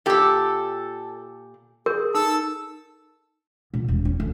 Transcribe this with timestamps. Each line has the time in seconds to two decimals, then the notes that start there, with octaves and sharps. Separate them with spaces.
0.06 A#2 G4 A4 E6
1.86 G#4 A#4 G6
2.15 D#4 A4 A5 E6
3.74 A#2
3.88 E1
4.05 C#4
4.20 D2